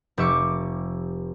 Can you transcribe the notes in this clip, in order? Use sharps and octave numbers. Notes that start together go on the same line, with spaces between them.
F1 G4 E5 C#6 D6